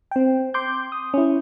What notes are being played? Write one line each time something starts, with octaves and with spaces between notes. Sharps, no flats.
C4 G5
C6 D6 G6
D#6
C#4 E4